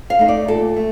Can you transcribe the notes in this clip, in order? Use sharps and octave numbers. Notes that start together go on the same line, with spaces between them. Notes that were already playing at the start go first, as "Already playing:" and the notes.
F5
A3 D#4
D5
A#2 A4
A3